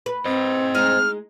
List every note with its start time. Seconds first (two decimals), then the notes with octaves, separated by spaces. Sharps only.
0.06 B4
0.25 C4 C5 D#5
0.75 G#3 D#4 F6